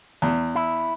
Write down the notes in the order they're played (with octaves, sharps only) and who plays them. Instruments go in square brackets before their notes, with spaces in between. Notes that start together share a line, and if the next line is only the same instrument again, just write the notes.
[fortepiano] E2
[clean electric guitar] E4